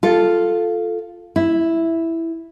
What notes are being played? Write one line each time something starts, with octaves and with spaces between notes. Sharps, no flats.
F4 A4
E4